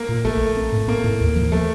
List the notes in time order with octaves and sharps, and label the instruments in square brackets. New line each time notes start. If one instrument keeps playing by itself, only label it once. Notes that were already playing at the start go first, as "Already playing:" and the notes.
Already playing: [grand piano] A#3
[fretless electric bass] A#2
[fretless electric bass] A#1 [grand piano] A3
[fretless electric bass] A#1
C4
A2
[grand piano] A#3 [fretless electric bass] C4
[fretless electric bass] A2
D#2
F3
[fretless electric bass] F3 [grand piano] A3